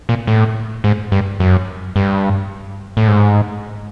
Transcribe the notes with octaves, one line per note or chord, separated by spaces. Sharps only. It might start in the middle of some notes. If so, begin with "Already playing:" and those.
A#2
A2
G#2
G2
F#2
G2
A2
G#2